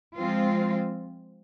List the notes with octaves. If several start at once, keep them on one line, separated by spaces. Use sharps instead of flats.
F3 G#3 C4 F4